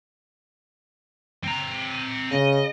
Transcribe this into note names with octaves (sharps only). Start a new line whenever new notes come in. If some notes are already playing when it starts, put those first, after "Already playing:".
C4 A#5
C#3 D#5